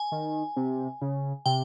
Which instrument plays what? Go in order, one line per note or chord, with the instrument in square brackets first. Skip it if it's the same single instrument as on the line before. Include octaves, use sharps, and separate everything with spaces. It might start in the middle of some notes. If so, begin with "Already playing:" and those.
Already playing: [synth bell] G#5
[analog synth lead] D#3
C3
C#3
[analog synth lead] C3 [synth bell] G5